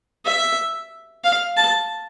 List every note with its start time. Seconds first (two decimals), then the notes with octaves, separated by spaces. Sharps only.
0.25 E5
1.24 F5
1.57 A5